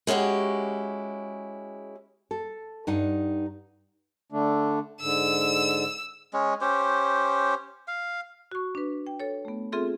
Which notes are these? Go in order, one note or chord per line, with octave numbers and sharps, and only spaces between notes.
G#3 C#4 E4 F#4 G4
A4
G2 D#4 F#5
D3 A3 D4
G#2 D3 E6
G#3 C#4
C#4 G4 C5
F5
F#4 C#6
D4 B4
G5
A4 C#5
A3 B3
C4 F4 G#4 A4 E5 C6